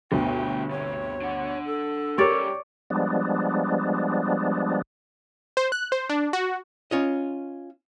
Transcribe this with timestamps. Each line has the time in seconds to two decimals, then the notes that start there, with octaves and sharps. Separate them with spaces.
0.12 G1 D2 B2 D4 G5 A#5
0.71 C3 C#5
1.22 D4 F#5
1.66 A4
2.18 G3 C#4 G4 A#4 C#5 D5
2.90 F3 G3 G#3 B3 D4
5.57 C5
5.72 F#6
5.92 C5
6.09 D4
6.33 F#4
6.91 C#4 F4 D#5